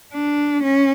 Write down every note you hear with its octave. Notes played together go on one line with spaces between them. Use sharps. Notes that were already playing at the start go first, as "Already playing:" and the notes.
D4
C#4